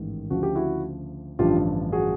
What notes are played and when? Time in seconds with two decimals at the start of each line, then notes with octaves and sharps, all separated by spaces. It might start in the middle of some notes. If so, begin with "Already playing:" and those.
Already playing: A1 G#2 D#3
0.30 D2 C#3 F3 F#4
0.43 G4
0.55 E4 F#4
1.39 A1 G2 D3 F3 F4 G4
1.92 F#4 G#4